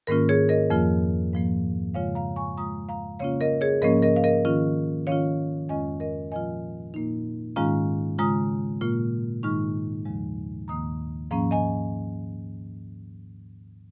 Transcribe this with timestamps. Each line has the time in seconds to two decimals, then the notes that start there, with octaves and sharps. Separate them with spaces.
0.07 G#2 D#3 A#3 C#4 F4 A#4
0.29 G#4 C#5
0.49 A#4 D#5
0.70 F2 F3 A#3 F4
1.33 G#2 F3 A#3
1.94 C#3 G#3 F4 C#5 F5
2.15 F5 A#5
2.36 G#5 C#6
2.57 C#3 G#3 F4 A#5 D#6
2.89 F5 A#5
3.19 C#3 A#3 C#4 F4 C#5 F5
3.41 A#4 D#5
3.61 G#4 C#5
3.82 G#2 F3 A#3 C#4 A#4 D#5
4.03 A#4 D#5
4.16 F5
4.24 A#4 D#5
4.45 D#3 C#4 F4
5.07 D#3 C#4 F4 C#5 F5
5.69 F2 D#3 G#3 C#4 F4 D#5 G#5
6.00 A#4 D#5
6.32 A#2 F3 A#3 F4 D#5 G#5
6.94 A#2 A#3 D#4
7.56 G#2 D#3 G#3 C#4 F4 F5 A#5
8.18 C#3 G#3 F4 A#5 D#6
8.81 A#2 A#3 F4
9.43 G#2 D#3 G#3 D#4 C#6 F6
10.05 D#2 C#3 F3 G#3
10.68 D#2 D#3 A#3 A#5 D#6
11.31 G#2 F3 A#3 C#4 F5 A#5
11.51 D#5 G#5